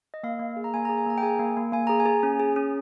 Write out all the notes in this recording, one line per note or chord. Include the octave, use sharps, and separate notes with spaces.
D#5
A#3 F5
A#3
G#4
A#5
A#3 G#5
A#5
G#4
G#5
A#3 A#5
G5
G#4 G#5
A#3
A#3
A#3 G#5
G#4 A#5
G#5
G#4
C#4
G#4
C#4